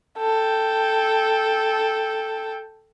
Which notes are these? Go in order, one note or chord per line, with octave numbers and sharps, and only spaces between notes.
A4 G5